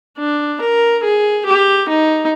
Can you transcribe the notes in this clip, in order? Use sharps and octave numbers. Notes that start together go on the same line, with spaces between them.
D4
A#4
G#4
G4
D#4